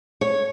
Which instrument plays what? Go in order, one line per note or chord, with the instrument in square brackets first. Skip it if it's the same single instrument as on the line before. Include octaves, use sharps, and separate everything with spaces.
[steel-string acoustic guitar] C#5